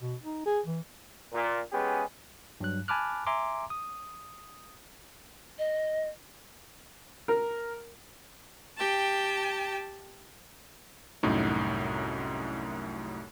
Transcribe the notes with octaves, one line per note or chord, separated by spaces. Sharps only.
B2
D#4
G#4
E3
A#2
G#3 B3 C#4 G4 G#4
G2 F#3 F#6
G#5 A5 B5 D6 F6 F#6
E5 G#5 A#5 C6 D6
D#6
D#5
A#4
G4 G5 A5
C2 F#2 A2 D#4